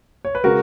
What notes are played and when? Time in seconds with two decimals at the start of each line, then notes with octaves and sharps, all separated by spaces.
0.25 C#5
0.35 B4
0.44 C#3 G#3 F#4 A#4